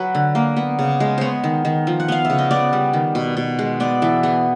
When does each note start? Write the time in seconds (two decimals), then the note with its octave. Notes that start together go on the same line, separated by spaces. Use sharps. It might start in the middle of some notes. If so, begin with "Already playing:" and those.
Already playing: F#3 B4
0.15 D3
0.35 A#3
0.56 B3
0.79 C#3
1.00 G#3
1.18 B3 C5 C#5
1.44 D#3
1.65 D#3
1.87 F3
2.00 F#5
2.08 B3 F5
2.25 C#3 E5
2.38 D#5
2.51 B3 D5
2.73 G3
2.93 D#3
3.15 B2
3.37 B2
3.59 G#3
3.80 B3 D5
4.02 E3 A4
4.23 B3 G#4